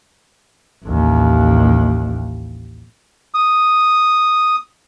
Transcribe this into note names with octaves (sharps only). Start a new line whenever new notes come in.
A1 D#2
D#6